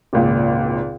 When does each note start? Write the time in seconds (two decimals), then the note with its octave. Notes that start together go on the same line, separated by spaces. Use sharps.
0.13 G#1 C#2 A#2